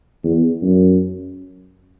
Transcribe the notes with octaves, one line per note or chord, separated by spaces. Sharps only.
E2
F#2